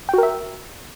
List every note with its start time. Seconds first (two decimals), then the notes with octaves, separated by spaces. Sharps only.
0.09 G5
0.13 F#4
0.18 A#4
0.23 E5